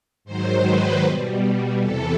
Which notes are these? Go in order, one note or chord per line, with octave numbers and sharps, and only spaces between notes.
G#2 D#3 F#3 C5
B4
B2 G3
E2 C3 E3 A4